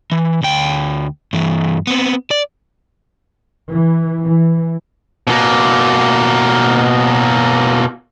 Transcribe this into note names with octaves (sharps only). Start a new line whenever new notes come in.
E3
D2 G5
G2 E3
B3 C4
D5
E3
E3
B2 A#3